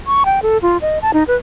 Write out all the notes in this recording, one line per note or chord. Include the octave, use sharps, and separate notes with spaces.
C#6
G5
A4
F4
D#5
A5
D#4
B4